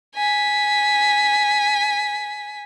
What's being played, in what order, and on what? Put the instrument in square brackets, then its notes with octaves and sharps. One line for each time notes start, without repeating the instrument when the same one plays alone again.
[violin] G#5 B6